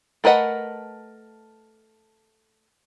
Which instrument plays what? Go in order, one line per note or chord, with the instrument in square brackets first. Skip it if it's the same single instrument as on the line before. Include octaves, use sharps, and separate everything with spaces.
[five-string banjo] A3 A#4 B4 D#5 F#5